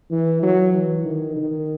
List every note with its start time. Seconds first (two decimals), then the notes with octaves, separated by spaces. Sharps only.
0.11 E3
0.42 F#3
0.73 E3
1.05 D#3
1.37 D#3